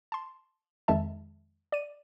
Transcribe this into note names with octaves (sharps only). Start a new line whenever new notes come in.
A5 C6
F2 D#3 G#3 E5 A5
D5 D#7